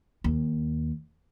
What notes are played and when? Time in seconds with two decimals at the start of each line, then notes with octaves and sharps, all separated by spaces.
0.24 D#2